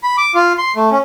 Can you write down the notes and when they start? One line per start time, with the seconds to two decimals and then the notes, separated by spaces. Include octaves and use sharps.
0.03 B5
0.18 D6
0.35 F4
0.58 C6
0.76 A3
0.91 C#4